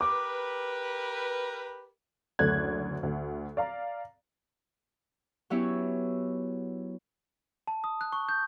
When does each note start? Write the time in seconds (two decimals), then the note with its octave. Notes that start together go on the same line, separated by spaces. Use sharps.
0.01 G4 A#4 B4 D6
2.39 F#1 D2 A3 D5 F#6 G#6
3.03 D2
3.57 D5 F5 A#5
5.50 F#3 B3 C#4 E4 G4 C#5
7.67 A5
7.84 D#6
8.01 F#6
8.13 C#6
8.29 G6